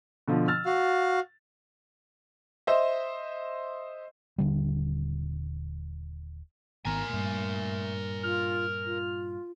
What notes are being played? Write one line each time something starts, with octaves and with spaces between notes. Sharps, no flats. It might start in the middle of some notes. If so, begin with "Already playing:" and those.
B2 D3 F3
E6 F6 A6
F#4 F5
C5 D#5 E5
D#1 D3 G3
G#1 D#3 B3 A#4 G#5 A#5
G2 A#2 A3
F4 F6
F4